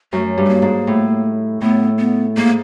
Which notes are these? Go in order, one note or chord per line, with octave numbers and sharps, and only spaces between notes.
F#2 A3
G2
A3
A#3
G#2
A2
A2 B3
B3
G#2 A#3